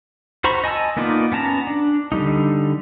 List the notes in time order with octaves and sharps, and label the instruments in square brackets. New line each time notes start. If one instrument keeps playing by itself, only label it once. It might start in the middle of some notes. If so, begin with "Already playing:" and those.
[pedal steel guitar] F#4 C5 A#5 B5 C#6
D#5 G#5 A5 E6
A#3 B3 D#4 F4 D5
B3 C#4 A5 A#5
D4
D3 G3 A3 D#4